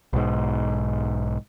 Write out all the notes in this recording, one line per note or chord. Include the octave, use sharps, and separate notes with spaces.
B1 G#2